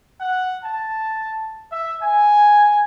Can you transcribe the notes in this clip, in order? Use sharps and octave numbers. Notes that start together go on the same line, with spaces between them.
F#5
A5
E5
G#5